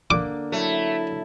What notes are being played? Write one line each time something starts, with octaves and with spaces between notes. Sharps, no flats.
D3 A#3 D6
F#3 A3 E4